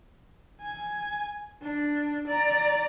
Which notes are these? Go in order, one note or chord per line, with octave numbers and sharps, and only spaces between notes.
G#5
D4
D5 A#5